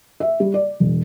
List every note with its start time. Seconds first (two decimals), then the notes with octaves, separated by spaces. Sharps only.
0.20 E5
0.40 G3
0.54 D5
0.80 E1